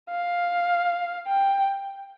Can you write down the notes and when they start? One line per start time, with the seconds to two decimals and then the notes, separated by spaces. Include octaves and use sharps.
0.10 F5
1.28 G5